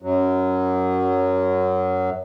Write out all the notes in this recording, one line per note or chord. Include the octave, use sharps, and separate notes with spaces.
F#2 F#3